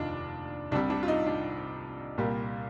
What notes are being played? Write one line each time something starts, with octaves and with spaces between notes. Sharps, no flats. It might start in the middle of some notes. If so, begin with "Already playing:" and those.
Already playing: F1 D#2 D4 D#4 F4
C2 C3 G3 D4
D4
F4
D#4
D4
C2 A#2 G3 A#3